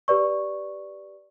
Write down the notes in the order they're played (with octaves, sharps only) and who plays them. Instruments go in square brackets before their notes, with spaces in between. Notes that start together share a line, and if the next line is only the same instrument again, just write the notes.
[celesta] G4 B4 D5 C#6